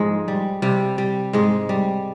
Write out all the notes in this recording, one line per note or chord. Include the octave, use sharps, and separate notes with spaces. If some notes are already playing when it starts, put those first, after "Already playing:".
Already playing: G#2 F3 G#3
G3
C3 G3
G3
G#2 G#3
G3